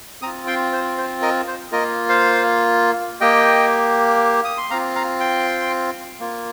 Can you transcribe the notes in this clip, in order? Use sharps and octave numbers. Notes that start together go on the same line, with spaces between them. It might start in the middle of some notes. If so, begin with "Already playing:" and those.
C4 F4 A#5 D#6
G5 C6
C5
C5
A#4 D#5
C5
A#3 F4 A#4 D#5
C5 F5
A#3 G4 D#5 G5
D#6
C6
C4 F4 F5 A#5
F5 A#5
G5 C6
A#3 F4